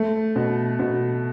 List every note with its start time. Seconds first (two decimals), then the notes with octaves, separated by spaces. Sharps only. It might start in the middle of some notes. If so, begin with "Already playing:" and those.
Already playing: A3
0.36 B2
0.79 B2